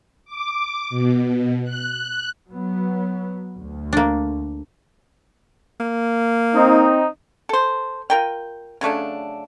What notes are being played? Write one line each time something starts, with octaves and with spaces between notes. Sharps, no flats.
D6
B2
F#6
F#3 B3
D2
A#3 D4
A#3
C4 D#4
A4 C5
F4 A#4 G5
C#3 F#3 A3 D4